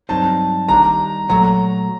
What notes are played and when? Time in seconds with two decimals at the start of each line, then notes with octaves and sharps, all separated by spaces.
0.09 G2 F#3 C4 D#4 A5
0.69 D#3 G3 D4 A#5
1.28 A#2 F#3 A3 A#5